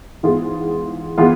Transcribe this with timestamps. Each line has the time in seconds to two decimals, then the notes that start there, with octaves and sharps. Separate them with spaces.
0.23 G#2 E3 B3 F4 G#4
1.18 E3 B3 F4 G#4